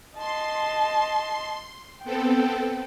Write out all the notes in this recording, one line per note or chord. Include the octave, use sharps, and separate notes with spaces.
D#5 A5 C6
B3 C4 A4 G5